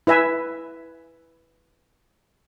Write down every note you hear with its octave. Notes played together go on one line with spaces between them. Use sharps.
E4 B4 E5 G#5